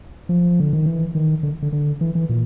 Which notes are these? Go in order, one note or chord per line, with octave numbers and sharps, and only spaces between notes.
F3
D3
D#3
E3
D#3
D3
D3
D3
E3
E3
A#2